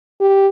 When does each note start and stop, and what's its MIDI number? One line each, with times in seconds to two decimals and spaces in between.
0.21 0.48 67